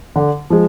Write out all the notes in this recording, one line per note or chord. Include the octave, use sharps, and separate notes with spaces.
D3
F3 G#3